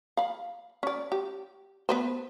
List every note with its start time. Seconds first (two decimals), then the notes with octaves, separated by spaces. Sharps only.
0.17 F5 B5
0.83 C#4 D5
1.12 G4
1.89 B3 B4 C5